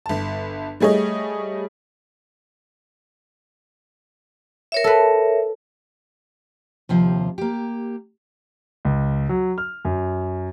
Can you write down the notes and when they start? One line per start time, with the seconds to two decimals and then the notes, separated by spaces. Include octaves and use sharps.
0.06 G1 A5
0.80 G3 A3 G#4 C#5 D#5
4.72 A#4 C#5 E5
4.84 A4 B4
6.89 D#2 C3 F3 F5
7.38 A#3 G4
8.85 C#2
9.29 F#3
9.58 F6
9.85 F#2